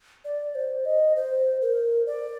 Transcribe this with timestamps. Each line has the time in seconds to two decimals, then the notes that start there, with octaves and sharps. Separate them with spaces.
0.25 D5
0.55 C5
0.85 D#5
1.16 C5
1.61 A#4
2.07 D5